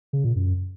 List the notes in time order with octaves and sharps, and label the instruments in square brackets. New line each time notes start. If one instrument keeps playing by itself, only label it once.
[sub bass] C#3
A#2
F#2